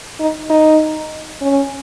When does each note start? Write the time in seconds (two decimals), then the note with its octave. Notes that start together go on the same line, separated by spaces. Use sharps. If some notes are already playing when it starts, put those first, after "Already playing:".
0.20 D#4
0.50 D#4
1.42 C#4